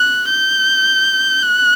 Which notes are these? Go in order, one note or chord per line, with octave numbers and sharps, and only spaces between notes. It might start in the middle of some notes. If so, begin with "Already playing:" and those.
Already playing: F#6
G6
F#6